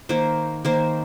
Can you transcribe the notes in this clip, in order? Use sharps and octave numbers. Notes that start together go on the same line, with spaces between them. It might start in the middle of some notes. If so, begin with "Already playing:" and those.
D#3 A#3 C5
D#3 A#3 C5